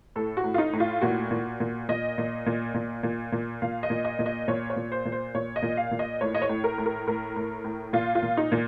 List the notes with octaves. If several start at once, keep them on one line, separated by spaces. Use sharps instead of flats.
A2 A4
F#4
A2
F4
D#4
A2
F4
A#2 F#4
A#2
A#2
A#2 D#5
A#2
A#2
A#2
A#2
A#2
A#2 F5
D#5
A#2
D#5
A#2
D#5
A#2 C#5
C#5
A#2
C5
A#2
C5
A#2 C#5
D#5
A#2
F5
A#2
D#5
A2 C#5
D#5
C#5
A2
A#4
A2
A#4
A2 A#4
A2
A2
A#2 F4
F4
A#2
D#4
A#2